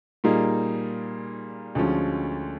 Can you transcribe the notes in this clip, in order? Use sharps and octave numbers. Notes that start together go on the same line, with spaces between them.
A#2 G3 A#3 D#4 G#4
D2 D3 F3 G#3 C#4